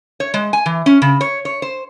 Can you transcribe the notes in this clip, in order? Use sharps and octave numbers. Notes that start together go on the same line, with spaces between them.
C#5
G#3
G#5
E3
C#4
C#3
C#5
C#5
C5